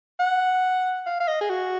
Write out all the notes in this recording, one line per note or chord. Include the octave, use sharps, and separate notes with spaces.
F#5
F5
F5
D#5
G#4
F#4